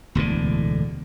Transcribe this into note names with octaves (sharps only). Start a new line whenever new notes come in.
E1 D2 A2 D3